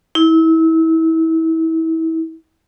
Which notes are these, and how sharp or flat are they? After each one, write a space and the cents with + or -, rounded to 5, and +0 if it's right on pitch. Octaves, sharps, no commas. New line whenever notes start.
E4 -30